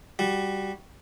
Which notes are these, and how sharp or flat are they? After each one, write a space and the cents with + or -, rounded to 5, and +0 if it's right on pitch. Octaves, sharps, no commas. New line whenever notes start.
G3 +0 F#4 +10